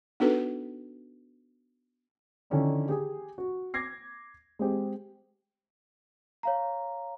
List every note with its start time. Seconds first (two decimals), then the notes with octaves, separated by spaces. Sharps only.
0.20 B3 D4 D#4 F#4 A4 B4
2.50 D3 D#3 F3 C#4 D4 E4
2.89 G4 G#4
3.38 F#4
3.74 D6 G#6 A#6 C7
4.59 G#3 C4 G4
6.43 C#5 F5 A#5